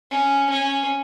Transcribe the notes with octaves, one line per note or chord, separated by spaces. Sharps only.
C#4
C#4